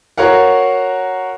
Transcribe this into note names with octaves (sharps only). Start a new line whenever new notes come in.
F#4 A#4 C#5 F5 F#5